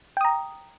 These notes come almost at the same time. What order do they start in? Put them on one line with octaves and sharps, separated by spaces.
G5 D#6 A#5